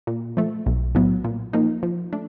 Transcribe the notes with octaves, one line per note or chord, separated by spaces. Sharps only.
A#2
F3 A3
B1
A2 F#3 B3
A#2
F3 A#3 D#4
F3
A3 D4